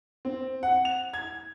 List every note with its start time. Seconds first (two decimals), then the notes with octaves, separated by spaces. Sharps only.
0.25 C4
0.63 F#5
0.85 F7
1.14 G#6